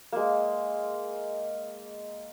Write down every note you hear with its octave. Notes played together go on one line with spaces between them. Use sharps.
G#3 A#3